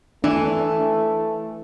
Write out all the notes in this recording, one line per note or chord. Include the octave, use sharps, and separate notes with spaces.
E3 A3 D4